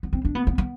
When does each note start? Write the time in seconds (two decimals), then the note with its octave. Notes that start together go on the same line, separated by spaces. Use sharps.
0.03 B3
0.13 C4
0.25 D4
0.35 B3
0.47 B3
0.58 B3